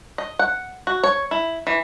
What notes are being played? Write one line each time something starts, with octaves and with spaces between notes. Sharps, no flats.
D#5
F#5
F#4
C#5
E4
E3